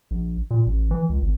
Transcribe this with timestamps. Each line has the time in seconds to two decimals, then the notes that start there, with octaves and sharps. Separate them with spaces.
0.11 A#1
0.51 A#2
0.66 A1
0.91 E3
1.09 C#2
1.22 G#1